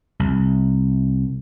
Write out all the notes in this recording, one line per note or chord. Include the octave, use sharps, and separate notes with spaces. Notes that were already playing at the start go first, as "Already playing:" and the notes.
C2